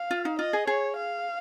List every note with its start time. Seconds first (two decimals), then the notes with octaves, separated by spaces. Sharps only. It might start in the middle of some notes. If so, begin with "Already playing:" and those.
Already playing: F5
0.11 F4
0.25 D#4
0.39 F4 D#5
0.53 G#4
0.67 G#4 C#5
0.96 F5